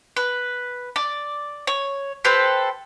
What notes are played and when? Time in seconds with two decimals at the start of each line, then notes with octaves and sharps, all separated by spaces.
0.17 B4
0.96 D5
1.67 C#5
2.25 G4 A4 B4 C5